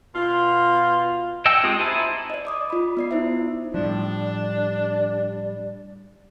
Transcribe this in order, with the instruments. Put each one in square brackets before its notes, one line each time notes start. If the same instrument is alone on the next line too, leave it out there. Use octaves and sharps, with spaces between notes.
[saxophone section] B2 F4
[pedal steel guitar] D#5 F#5 G5 A5 E6
G#3 C4 F4 G4 D#6
D#4 E4 C5 G#5 A5
[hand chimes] D5 D#5
D5 D6 D#6
F4 B5
B3 D5 C7
D#4 E4 C5 E5
[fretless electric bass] A2 F3 [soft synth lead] G3 [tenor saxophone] D4 [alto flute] D5